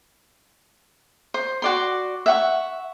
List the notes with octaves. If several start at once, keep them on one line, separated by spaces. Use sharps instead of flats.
C5
F#4 D5 C6
E5 F#5 C#6